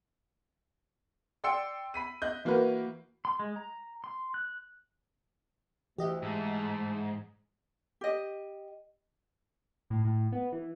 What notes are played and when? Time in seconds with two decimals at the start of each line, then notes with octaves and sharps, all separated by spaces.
1.44 D5 G5 C6 E6 C#7
1.94 B5 B6 D#7
2.22 D#5 F#6 G6
2.45 E3 A#3 F#4 A#4 B4
3.25 C6
3.39 G#3
3.56 A#5
4.04 C6
4.34 F#6
5.98 D2 E3 G4 D#5 E5
6.22 G#2 A3
8.01 G4 D#5
9.90 A2
10.05 A2
10.32 B3
10.52 E3